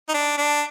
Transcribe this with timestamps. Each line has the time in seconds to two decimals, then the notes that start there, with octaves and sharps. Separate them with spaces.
0.09 D#4
0.14 D4
0.38 D4